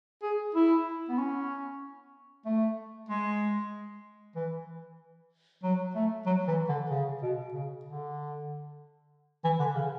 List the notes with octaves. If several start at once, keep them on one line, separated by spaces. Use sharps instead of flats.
G#4
E4
B3
C#4
A3
G#3
E3
F#3
A3
F#3
E3
D3
C#3
B2
C#3
D3
E3
D3
C#3